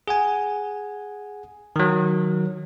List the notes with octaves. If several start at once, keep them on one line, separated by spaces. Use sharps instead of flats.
G#4 F#5 G#5
D#3 F#3